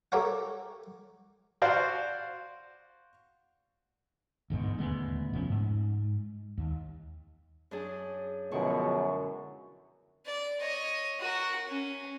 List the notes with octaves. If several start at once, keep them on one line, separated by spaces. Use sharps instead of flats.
G4 A4 A#4 C#5 E5 F#5
F#4 C5 D5 F5
G1 E2 G#2 B2
D#1 D2 G#3 B3
F1 F3 B3 C#4
G#2
D#2
F#2 D4 G#4
F#2 B2 D3 F3 G#3 E4 C#6
D5
C#5 D#5
F#4 A#4
C#4